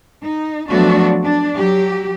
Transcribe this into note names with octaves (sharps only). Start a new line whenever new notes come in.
D#4
F3 F#3 A3 B3 D4 F#4
D4
F#3 G4